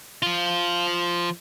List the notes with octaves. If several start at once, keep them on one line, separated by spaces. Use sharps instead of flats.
F3 F4